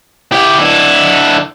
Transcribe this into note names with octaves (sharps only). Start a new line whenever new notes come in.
E4 G4
D3 E4